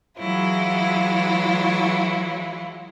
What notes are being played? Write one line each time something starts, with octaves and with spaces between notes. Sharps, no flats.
E3 F#3 G#3 E4 F4